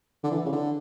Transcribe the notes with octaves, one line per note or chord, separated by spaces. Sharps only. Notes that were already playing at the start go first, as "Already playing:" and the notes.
D3
E3
C#3
D3